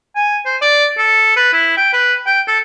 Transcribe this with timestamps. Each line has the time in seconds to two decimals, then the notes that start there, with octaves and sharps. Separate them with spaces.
0.15 G#5
0.45 C5
0.62 D5
0.98 A4
1.37 B4
1.53 E4
1.77 G5
1.93 B4
2.26 G5
2.47 A4